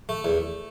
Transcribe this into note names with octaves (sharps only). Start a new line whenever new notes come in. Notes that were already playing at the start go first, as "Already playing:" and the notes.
A3
E2